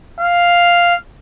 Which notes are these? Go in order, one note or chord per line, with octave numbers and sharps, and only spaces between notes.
F5